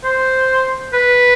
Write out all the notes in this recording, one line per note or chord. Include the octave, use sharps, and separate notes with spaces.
C5
B4